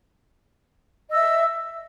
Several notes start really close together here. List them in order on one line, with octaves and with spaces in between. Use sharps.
D#5 E6 E5